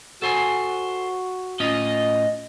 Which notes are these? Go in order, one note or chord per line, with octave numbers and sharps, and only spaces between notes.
F#4 A4 C5 G#5
A2 C#4 F4 D#5